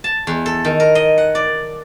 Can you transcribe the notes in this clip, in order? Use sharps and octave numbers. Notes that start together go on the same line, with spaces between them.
A5
E2
A4
D#3
A#4
D#5
F#5
D5